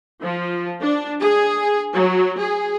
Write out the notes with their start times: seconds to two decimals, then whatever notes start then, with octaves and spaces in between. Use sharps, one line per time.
0.23 F3
0.81 D4
1.20 G#4
1.94 F#3
2.38 G#4